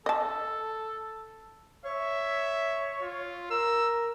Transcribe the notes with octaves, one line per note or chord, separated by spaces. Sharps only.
A4 D#5 A5
C#5 E5
F4
A#4 E6